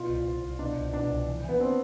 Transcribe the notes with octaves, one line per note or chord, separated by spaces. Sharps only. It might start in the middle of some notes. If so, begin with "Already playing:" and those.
Already playing: B2 F4
C2
C2
C2
B2 D4
C2
B2 D4
C2
E3
E3 B3
C4 D4